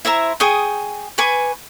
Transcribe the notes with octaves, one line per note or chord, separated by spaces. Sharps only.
E4 C5 E5 A#5
G#4 G5 C#6 D#6
B4 G#5 C#6 D6